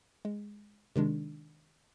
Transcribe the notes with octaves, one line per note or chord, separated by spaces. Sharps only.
G#3
C3 D#3 G#3 D4